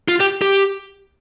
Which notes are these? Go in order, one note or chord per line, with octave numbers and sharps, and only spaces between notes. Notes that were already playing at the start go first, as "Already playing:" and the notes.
F4
G4
G4